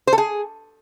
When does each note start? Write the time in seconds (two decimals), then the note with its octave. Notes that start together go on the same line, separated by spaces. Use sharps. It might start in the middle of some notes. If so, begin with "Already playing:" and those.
0.07 C5
0.13 A4
0.18 G#4